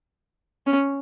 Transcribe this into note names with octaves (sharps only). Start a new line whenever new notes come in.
C#4